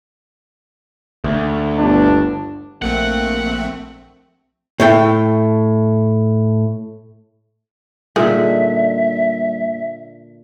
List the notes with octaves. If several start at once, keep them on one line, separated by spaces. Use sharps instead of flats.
D2
G1 B3 D4
A#1 A3 A#3 C4 F#5
A2 A3 G5
A#2 D3 D#3 G3 G#3 A#3 G#4 E5